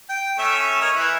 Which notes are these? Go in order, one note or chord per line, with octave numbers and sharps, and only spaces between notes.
G5
A3 C#4 E5
A#4 C#5 D#5
E3 E4